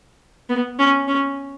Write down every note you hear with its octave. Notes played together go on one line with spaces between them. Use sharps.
B3
C#4
C#4